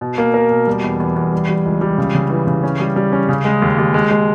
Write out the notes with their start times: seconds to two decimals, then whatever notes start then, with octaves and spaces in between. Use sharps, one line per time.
0.01 B2
0.18 A#3
0.34 A#4
0.51 B2
0.67 G3
0.84 E2
1.00 E2
1.16 E2
1.33 G3
1.49 G3
1.65 C#2
1.81 G3
1.98 C#3
2.15 C#3
2.30 E3
2.47 C#3
2.63 C#4
2.80 G3
2.96 G3
3.12 C#4
3.29 C#3
3.45 G#3
3.62 D#2
3.78 D#2
3.94 G#3
4.11 G#3